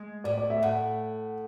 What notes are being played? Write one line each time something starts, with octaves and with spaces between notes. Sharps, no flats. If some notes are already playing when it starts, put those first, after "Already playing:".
Already playing: G#3
A2 D5
D5
E5
A2 F#5